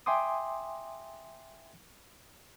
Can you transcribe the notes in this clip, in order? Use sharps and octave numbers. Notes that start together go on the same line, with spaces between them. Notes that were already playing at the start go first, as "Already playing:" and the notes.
E5 G5 G#5 C6 D6 D#6